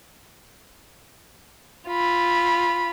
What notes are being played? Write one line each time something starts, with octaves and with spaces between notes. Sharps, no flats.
F4 B5